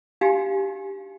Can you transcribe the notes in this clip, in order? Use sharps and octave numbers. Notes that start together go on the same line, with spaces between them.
D4 D#4 F#4 G4 F5 G#5